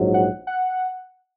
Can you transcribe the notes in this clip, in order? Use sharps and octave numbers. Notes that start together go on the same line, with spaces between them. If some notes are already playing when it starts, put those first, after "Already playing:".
Already playing: A#1 G#2 F#3
F#5
F#5